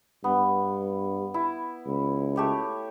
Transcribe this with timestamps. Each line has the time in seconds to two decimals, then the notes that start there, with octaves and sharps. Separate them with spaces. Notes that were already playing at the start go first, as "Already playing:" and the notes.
0.24 G2 B3
1.34 E4
1.86 C#2
2.36 A3 G4 C#5